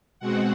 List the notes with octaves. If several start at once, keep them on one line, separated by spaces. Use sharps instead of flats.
B2 G#3 C4 F#4 F#5